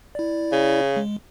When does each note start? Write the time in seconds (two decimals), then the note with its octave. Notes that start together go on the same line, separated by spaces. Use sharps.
0.15 E4 D5
0.52 C#3
0.97 G#3